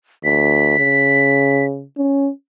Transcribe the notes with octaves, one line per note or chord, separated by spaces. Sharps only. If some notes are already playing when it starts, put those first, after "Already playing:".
D2 B6
C#3
C#4